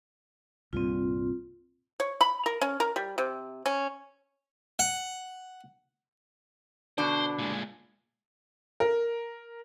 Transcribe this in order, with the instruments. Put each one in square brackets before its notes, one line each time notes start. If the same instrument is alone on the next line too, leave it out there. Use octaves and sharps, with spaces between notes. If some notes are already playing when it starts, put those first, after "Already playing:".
[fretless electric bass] C2 G2 A#2 [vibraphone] C4 F4
[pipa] C#5
B5
A#4
C#4
A#4
G3
C3
C#4
[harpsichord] F#5
[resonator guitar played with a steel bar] B2 D3 D4 [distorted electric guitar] C5
[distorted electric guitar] A#2 G#3
[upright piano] A#4